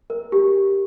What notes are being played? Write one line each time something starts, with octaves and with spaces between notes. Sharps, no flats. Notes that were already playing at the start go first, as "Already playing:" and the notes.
A#4
G4